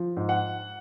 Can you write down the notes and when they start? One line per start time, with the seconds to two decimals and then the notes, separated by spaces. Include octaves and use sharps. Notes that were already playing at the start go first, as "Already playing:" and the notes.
Already playing: F3
0.17 G#2
0.29 F#5